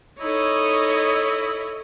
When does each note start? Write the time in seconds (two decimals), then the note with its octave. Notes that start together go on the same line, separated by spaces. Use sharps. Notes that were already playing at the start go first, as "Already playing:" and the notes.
0.20 D#4 E4 A4 C#5 D#5